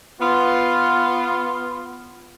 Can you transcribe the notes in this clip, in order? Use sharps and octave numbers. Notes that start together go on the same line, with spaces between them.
B3 F4